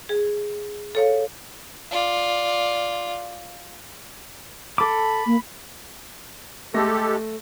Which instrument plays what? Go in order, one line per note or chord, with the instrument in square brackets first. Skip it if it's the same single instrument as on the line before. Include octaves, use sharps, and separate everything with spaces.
[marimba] G#4
A4 C#5 F5
[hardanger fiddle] F4 D5
[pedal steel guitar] A4 D6 [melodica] B5
[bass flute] A#3
[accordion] G#3 G4 A4 [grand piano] A3 A#6